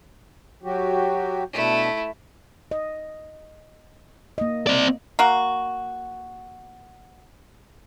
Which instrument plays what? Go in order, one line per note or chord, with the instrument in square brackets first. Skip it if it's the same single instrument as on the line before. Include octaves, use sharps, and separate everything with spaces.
[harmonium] F#3 F#4 G4
[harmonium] B2 D4 [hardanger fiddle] A3 E4
[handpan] D#5
A#3 D#5
[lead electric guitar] C4 D5
[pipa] A#3 F#4